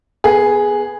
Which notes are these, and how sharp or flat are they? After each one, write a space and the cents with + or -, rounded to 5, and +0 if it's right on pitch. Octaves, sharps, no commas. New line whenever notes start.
B3 +0 G#4 +0 B4 -45